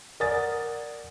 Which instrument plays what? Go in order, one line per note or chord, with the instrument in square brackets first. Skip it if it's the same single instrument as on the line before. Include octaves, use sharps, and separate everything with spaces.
[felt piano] A#4 D5 F#5 G#5 D#6 A6